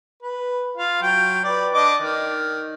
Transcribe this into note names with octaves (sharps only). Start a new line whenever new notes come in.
B4
F4 F5
F#3 G5
B4 D5
D4 D#5 D6
D#3